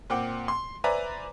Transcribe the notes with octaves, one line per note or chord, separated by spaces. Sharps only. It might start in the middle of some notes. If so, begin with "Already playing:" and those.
A#2 C4 F#5 G5 D6
C6
B4 C5 D5 E5 G#5 A#5